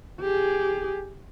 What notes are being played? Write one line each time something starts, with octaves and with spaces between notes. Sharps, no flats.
G4 G#4